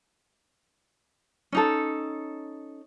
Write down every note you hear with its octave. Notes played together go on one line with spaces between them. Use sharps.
C#4 D#4 A4